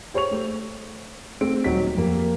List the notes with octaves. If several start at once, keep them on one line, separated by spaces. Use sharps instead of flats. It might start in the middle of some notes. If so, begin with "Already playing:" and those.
G4 C5 C#5 C#6 F7
A3
A3 C4 D7
D#1 F#3 D#4 B6
F2 A#3 G4